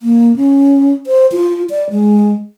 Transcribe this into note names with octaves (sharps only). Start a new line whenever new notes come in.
A#3
C#4
C5
F4
D5
G#3